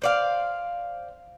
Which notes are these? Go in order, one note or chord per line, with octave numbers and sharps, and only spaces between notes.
C5 D5 F5